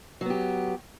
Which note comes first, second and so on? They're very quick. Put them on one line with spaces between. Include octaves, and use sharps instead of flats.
F#3 B3 G4